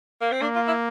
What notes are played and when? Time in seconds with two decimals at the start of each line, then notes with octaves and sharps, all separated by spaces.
0.21 A#3
0.32 C4
0.42 A#3 D4
0.55 F4
0.67 E4